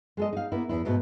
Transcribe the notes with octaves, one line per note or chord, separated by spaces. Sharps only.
G#3 A4 D#5
D#4 F5
A#3 B3 E4
E2 E4
G#2 B2 A3